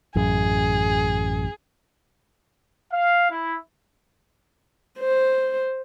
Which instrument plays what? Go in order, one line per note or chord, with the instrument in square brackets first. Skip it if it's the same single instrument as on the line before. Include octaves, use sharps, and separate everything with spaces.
[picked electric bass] A1 F#2 [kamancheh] G#4
[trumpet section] F5
E4
[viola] C5